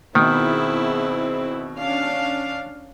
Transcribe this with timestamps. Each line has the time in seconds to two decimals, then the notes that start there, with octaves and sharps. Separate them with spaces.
0.15 B2 D#3 B3 C4 E4 G#4
1.76 C#4 D4 F5